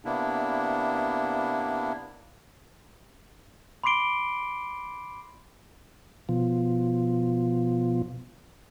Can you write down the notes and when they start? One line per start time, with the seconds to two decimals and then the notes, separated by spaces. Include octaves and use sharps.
0.05 C3 A#3 B3 D4 E4
3.84 B5 C6 D6 C7 D7 G7
6.29 B2 F3